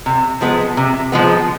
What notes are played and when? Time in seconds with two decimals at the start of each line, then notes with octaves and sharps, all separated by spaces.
0.06 C3
0.41 F3 G#3 B3
0.77 C3
1.12 F3 G#3 B3